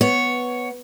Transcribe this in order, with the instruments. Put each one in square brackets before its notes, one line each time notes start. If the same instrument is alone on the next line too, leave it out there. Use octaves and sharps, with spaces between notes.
[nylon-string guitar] B3 [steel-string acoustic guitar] C#5